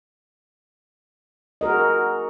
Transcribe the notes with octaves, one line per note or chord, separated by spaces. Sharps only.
F#4 G#4 A#4 D#5